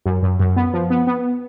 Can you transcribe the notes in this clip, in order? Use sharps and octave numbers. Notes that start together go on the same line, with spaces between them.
F#2
F#2
F#2
B3
F3
B3
B3